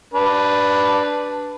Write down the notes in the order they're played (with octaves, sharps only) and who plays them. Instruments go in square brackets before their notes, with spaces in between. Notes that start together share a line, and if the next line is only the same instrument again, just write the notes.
[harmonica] D4 B4